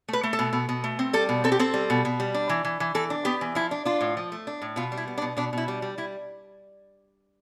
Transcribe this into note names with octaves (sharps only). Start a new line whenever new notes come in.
A3 B4
A3
A4
B2
B2
B2
A3
C4
G3 A4
B2
C4 A4
G4
C4 A4
G3
B2
B2
G3
D4
E3
E3
E3
E3 A4
D4
B3 G4
E3
F3 E4
D4
D4 F4
A2
F3
A3
D4
A2
B2 F4
G3
E4
B3
D4
B2
B2 D4
B2 E4
G3
G3
G3 E4